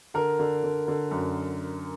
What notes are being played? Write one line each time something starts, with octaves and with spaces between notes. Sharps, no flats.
D3 A#4
D3
D3
D3
F#2